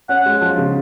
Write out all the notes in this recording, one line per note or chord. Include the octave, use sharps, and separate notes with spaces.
C#4 F#5
G#3
F3
C#3